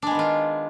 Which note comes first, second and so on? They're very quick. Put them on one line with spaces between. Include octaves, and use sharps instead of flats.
D4 G#3 B3 D#3 F4